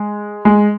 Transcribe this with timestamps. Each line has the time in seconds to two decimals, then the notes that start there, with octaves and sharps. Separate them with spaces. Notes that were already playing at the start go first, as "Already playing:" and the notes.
Already playing: G#3
0.45 G#3